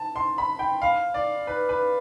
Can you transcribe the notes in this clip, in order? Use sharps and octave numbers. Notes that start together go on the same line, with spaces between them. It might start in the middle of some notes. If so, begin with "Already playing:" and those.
Already playing: A5
C6
B5
G5
F5
D5
B4
B4